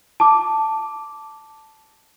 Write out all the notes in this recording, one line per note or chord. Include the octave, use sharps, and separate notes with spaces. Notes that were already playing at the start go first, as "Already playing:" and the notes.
A5 D6